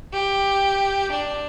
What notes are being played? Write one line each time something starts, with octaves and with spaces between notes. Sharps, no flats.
G4
D4